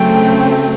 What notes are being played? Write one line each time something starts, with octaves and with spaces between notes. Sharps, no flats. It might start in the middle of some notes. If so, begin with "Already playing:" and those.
Already playing: C#3 F#3 A3 C4 G5